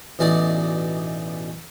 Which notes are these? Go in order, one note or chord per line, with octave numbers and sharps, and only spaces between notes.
A1 B2 E3 D#4 D5 G#5